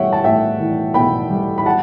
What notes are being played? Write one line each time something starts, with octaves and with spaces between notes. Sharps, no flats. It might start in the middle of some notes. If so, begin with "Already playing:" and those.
Already playing: B1 E3 G3 C#5 E5 F#5 G5
A5
A2 E5 G5
E3
B1 G5 B5
G3
B5
F#5 A5